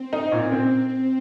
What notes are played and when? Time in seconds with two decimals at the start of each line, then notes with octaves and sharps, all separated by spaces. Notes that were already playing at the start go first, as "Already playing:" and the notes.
Already playing: C4
0.13 D#4
0.32 A#2
0.52 C4